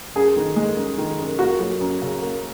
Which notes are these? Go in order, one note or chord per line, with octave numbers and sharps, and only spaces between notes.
F#2 G#4
D#3
G#3
F#2
D#3
F#2
A#3 F#4
F#3
F#2
C#3
A#3